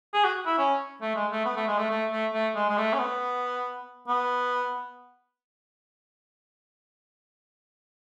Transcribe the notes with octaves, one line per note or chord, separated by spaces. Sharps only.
G#4
F#4
E4
C#4
A3
G#3
A3
B3
A3
G#3
A3
A3
A3
A3
G#3
G#3
A3
C#4
B3
B3